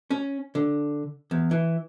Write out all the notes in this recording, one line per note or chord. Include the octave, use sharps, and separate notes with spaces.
C#4
D3
E2
E3